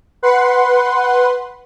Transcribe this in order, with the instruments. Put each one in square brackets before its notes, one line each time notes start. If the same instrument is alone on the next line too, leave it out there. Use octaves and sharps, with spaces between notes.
[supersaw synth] B4 F#5 C6